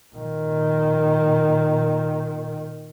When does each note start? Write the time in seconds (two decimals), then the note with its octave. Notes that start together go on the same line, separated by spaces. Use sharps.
0.15 A#2 D#3